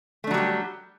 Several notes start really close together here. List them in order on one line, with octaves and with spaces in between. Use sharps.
A3 D4 F#3 G3 G4